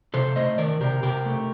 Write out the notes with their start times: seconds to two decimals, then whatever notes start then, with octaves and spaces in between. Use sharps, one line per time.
0.14 C3 A4 C5
0.36 A3 C5 D#5
0.58 D#3 A#4 D5
0.81 C3 G4 A#4
1.03 C3 G4 A#4
1.26 A3